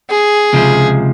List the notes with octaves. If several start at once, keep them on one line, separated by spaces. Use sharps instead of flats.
G#4
C#2 C3 F3